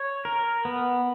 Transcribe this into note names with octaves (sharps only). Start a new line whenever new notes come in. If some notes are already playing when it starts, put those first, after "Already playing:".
Already playing: C#5
A#4
B3